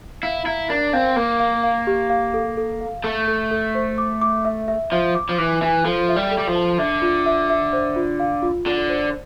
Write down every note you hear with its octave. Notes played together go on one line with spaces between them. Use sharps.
E4 F5
E4 A#5
D4 A#4
C4 F5
A#3 A#4
F5
F5
G4
F5
A4
A4
F5
A3 A4
A4
A4
C5
D6
D6
E5
E5
F3 E5
D6
F3
E3 D6
E3 E5
F3 A4
E5
G3
A4
G3
F3
A5
D3 E5
F4
E5
E5
C5
F4
F5
F4
D3 F4
C5